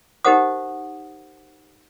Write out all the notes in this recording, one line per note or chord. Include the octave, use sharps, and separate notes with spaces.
D#4 G4 A#4 C5 F#5 D#6